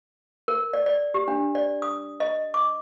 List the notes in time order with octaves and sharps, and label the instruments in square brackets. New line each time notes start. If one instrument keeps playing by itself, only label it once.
[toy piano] A#4
D5
D5
G4
D4
D5
D#6
D#5
D6